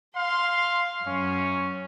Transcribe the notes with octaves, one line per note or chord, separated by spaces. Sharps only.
F5 C6
F#2 C#4